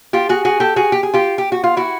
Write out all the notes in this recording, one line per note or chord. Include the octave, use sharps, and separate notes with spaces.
F4 G4
F#4 G#4
F#4 G#4
G4 A4
F#4 G#4
G4
G#4
F4 G4
G4
F#4
F4
E4 F#4